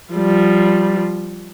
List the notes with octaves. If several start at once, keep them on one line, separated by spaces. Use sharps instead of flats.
F3 G3